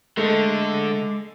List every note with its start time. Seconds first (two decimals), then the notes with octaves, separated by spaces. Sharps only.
0.17 D3 G#3 A3 A4 D#5